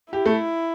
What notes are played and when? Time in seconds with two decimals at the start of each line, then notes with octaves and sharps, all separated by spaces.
0.13 E4 G4
0.26 A3